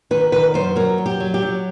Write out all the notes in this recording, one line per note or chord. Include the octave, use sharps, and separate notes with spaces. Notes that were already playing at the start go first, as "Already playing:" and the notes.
D#3 B4
D#3 B4
F#2 C5
F#3 A#4
F#2
G4
F#3
G4
F#3